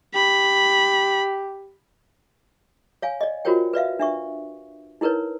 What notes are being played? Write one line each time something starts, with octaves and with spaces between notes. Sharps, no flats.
G4 B5
C#5 F5 G#5
D5 D#5
F4 F#4 A#4 C5 C#5 G5
B4 D5 E5 F5
D4 E5 C#6
D#4 E4 A#4 B4 C#5